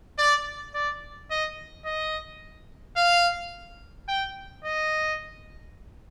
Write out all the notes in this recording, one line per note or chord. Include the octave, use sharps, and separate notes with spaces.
D5
D5
D#5
D#5
F5
G5
D#5